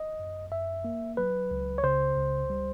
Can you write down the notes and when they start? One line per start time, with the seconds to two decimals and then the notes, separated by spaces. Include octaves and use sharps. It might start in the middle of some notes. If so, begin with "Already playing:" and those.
Already playing: D#5
0.19 F#2
0.52 F#2 E5
0.84 A#3
1.17 F#3 B4
1.51 C#2
1.78 C#5
1.83 C#3 C5
2.16 C#2
2.50 G3